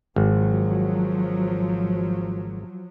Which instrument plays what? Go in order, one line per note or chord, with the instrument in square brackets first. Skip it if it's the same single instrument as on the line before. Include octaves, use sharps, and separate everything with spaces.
[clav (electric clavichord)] G#1 [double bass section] F3 F#3